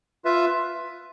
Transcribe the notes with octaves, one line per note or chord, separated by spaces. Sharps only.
F4 B4 E5